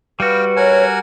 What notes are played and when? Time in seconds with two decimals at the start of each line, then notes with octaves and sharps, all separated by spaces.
0.20 G3 F#4 B4 F5 G5
0.56 A#4 C#5 F#5 G#5